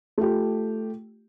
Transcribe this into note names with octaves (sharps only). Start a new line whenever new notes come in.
A3 F4 G4